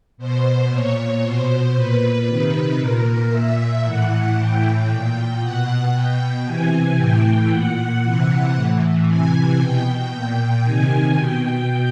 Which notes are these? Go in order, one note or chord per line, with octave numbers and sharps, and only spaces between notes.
B2 C5
A#2 C#5
B2 C5
A#2 B4
C3 D#3
A#2 A#4
A#2 E5
A2 E3 F#5
A2 E3 G5
A#2 G5
B2 F#5
B2 G5
C3 E3 G#5
A2 E3 G5
A#2 F#5
C3 E3
A2 E3
C3 E3 G#5
B2 G5
A#2
C3 D#3 G#5
B2 G5